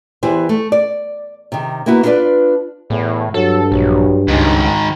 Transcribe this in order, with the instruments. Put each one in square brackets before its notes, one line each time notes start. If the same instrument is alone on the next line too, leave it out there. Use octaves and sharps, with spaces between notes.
[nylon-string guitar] E2 E3 E4 G4 C5
A3
D5
C3 D#3
A#3 B3 E4 F#4
D4 E4 F4 A#4 B4 D5
[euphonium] E2 [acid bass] A2
[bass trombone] G2 [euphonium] F#3 [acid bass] A4
[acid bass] A#1 [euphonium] F#3
[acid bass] C#2 [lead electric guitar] G#2 D#3 [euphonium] D#4